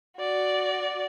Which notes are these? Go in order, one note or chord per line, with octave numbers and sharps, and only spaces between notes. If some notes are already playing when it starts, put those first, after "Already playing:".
F#4 D5